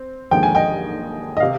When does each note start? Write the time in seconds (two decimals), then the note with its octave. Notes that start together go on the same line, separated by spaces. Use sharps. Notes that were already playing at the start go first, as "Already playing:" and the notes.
Already playing: C4
0.31 D#2 D3 F3 G#3 G5
0.43 G#5
0.55 D#5 G5
1.37 D#5
1.40 C3 F5